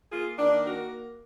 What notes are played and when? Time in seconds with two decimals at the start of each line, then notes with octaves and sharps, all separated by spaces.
0.12 A#3 F4 G#4
0.38 D#3 A#3 D4
0.65 A#3 F#4 A#4